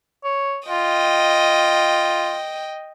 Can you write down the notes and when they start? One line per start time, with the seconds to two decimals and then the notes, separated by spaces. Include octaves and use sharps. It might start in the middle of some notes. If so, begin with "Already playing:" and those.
0.24 C#5
0.69 F4 D#5 G5